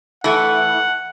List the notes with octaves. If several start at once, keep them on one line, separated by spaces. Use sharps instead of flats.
E3 A3 F#5